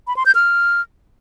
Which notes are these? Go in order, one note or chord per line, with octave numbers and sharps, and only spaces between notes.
B5
C6
G6
F6